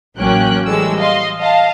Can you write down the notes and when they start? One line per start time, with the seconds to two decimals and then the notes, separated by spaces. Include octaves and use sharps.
0.18 A1 F#3 A#3 C#4 G5 F#6
0.67 E3 G3 G#3 A4 E6
0.98 D#5 F5 C6
1.40 D#5 F5 A5